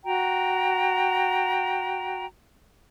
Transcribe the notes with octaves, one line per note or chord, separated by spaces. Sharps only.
F#4 G5 A#5